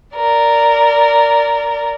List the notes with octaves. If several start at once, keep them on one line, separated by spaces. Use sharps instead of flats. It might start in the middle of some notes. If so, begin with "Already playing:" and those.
A#4 D5